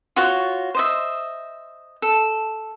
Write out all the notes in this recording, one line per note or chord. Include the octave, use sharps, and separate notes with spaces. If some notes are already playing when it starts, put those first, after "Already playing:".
F4 F#4 C#5
C5 D#5 E5
A4